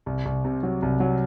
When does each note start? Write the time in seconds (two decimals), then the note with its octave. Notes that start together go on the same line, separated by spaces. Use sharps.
0.06 C2
0.25 C2
0.44 C3
0.63 F#3
0.82 C2
1.00 F#3